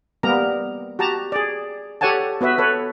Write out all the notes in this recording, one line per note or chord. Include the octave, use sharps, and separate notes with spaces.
G3 A#3 B3 G4 A#4 A#5
F#4 G4 A5 A#5
G#4 D5
G4 A4 C#5 F#5 G#5 A5
B3 F#4 B4 E5
A4 B4 C#5